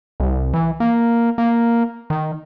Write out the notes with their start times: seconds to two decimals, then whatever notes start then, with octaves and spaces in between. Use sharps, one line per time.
0.20 C2
0.53 E3
0.80 A#3
1.38 A#3
2.10 D#3